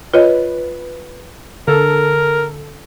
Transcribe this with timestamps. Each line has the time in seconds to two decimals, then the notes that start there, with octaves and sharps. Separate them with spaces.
0.14 F4 B4 C#5 D#5
1.68 D3 A4 A#4